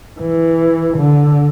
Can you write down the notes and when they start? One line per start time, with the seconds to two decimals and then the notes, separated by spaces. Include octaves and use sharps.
0.20 E3
0.98 D3